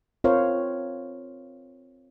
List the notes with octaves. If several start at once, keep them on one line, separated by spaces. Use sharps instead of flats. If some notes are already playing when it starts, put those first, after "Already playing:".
C4 F4 A#4 C5 C#5 F5